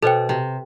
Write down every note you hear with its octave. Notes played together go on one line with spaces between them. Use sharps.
B2 A4 C5 G5
C3